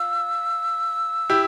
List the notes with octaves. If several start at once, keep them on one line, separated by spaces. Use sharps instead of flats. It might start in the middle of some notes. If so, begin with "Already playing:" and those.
Already playing: F4 E6
E4 G4